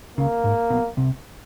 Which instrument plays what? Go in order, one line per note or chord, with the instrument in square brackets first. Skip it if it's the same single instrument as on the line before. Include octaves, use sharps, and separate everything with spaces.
[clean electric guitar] C#2 C#3 [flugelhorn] A#3
[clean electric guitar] G#2
B1 B2
C2 C3